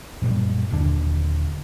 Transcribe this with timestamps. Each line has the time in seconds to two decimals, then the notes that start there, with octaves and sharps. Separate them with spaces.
0.22 F#2 A#2 G3
0.71 D#1 D#2 D3 D4